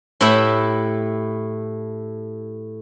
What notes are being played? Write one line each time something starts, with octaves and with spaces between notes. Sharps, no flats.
A2 A3 E4 G4 E5 F#5